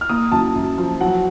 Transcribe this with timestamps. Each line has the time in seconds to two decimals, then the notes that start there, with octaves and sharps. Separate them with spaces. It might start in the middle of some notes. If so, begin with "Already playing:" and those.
0.01 F6
0.09 A#3 D#6
0.32 F#2 A5
0.55 F#2
0.78 F3
1.01 F#3 F#5